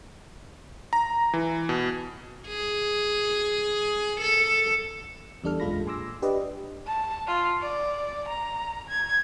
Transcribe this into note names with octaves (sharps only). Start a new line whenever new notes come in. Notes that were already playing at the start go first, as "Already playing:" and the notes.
A#5
E3
B2
G#4
A4
E2 G3 D4 A4 F6
B1 F#2 G#3 F4 B5 A#6
A#2 G#5 C6 D6 E6 A#6
D4 G4 B4 D5 D#5
A5
F4
D5
A#5
G#6